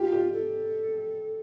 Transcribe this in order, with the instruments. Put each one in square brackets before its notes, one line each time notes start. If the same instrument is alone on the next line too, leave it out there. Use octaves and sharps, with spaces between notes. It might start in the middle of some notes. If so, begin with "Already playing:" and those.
Already playing: [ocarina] F4 [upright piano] G4
[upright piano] G4
[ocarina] A4